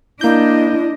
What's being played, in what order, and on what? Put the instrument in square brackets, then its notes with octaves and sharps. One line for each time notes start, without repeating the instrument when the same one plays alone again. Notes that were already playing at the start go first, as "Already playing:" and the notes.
[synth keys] A#3 G6 [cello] D4 D#5 [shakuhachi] E4